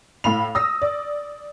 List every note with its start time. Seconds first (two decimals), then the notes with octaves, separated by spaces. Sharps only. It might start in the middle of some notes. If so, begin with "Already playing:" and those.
0.24 A2 F5 B5 F7
0.55 D#6 E6 A#6
0.82 D5